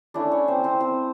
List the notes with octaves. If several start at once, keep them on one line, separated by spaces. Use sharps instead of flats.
A3 C#4 D4 E4 D5
C#4 C#5
C4 C5
C4 C5
C4 C5